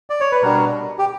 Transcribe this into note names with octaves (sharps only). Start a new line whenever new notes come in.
D5
C#5
B4
B2 G3 B3 D4 A#4
G4